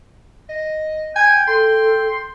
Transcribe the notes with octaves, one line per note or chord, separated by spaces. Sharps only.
D#5
G5 G#5
A4 C6